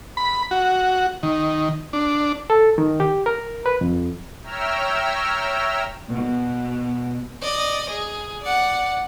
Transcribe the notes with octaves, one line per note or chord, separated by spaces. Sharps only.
B5
F#4
D#3
D4
A4
D#3
G4
A#4
B4
F2
C#5 E5 G5 A#5 E6 F6
B2
D5 D#5
G#4
D5 F#5